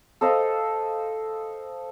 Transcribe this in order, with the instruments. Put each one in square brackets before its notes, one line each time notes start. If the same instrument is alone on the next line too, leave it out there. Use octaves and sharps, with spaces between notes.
[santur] A4 C5 D#5 F5